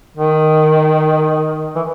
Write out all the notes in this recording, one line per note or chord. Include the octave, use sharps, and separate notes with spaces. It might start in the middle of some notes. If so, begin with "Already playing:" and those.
D#3
E3